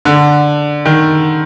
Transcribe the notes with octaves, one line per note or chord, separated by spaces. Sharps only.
D3
D#3